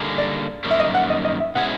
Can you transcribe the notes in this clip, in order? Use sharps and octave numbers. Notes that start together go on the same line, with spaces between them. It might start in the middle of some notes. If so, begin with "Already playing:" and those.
Already playing: D3 G3 A#3 D#4 G#4
D5
F#2 D#3 G3 A#3
E5
D#5
F#5
D#5
D#5
E5
B2 G#3 C#4 E4 G#4 F#5